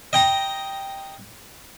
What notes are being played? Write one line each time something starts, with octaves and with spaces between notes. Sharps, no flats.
D#5 G5 A#5